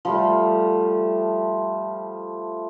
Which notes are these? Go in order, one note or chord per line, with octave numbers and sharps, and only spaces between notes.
F3 G3 A3